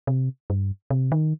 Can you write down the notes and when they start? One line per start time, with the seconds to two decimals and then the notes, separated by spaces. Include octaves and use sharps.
0.07 C3
0.50 G2
0.90 C3
1.12 D#3